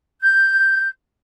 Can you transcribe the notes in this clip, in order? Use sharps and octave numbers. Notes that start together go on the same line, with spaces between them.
G6